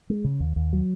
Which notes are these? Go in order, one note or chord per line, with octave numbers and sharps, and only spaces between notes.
G#3
C#3
D#2
D#2
F#3